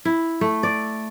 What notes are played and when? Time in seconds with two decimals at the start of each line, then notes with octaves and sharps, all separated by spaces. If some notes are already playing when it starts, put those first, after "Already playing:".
0.05 E4
0.41 A3
0.63 D5